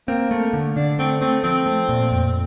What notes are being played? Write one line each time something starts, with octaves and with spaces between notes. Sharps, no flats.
A#3 C4
A3
D3
D3 D4
A3 C4
A3 C4
F3 C4
A3
A#2
F2